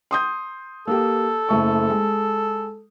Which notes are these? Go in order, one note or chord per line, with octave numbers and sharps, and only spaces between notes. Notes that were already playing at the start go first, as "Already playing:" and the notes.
C6 D#6 G6
A#3 G4 A4
F#1 A3 C#6
G#3